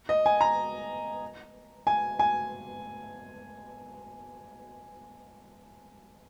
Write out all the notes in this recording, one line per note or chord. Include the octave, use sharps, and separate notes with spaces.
D#5
G#5
A#5
G#5
G#5